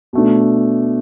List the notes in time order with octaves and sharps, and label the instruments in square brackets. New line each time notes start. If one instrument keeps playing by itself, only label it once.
[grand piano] B2 A3 D4